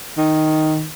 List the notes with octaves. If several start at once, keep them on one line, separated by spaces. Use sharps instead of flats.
D#3